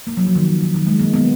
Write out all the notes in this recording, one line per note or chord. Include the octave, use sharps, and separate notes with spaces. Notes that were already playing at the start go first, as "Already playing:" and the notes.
A#3
F#3
F3
D#3
C#3
D#3
D#3
G#3
A#3
B3